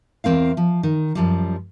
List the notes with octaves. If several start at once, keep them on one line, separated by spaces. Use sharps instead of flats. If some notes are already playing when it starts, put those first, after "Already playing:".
E2 C4 A#4 F5
F3
D#3
F#2 F3 G3